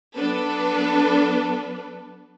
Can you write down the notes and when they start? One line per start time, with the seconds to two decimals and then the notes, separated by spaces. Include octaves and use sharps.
0.14 F#3 B3 D4 A4 B4